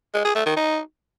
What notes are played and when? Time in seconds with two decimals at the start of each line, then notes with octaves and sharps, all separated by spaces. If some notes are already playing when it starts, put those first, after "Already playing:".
0.14 G#3
0.25 G#4
0.35 A3
0.46 D#3
0.56 D#4